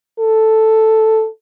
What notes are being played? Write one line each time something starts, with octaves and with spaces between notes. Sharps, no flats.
A4